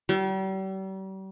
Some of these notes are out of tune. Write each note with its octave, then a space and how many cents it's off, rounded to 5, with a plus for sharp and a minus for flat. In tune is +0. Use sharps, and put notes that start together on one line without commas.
G3 -40